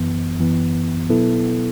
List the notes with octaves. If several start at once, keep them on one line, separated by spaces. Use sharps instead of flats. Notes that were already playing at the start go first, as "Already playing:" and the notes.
Already playing: F#2 E3 B3
F#2 E3 B3
B2 F#3 B3 E4 A4